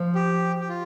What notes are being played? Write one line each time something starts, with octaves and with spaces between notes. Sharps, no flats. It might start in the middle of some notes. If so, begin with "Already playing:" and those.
Already playing: F3
G4
G4
F4